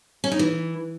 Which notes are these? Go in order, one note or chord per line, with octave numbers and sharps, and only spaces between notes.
C#4
D#4
E3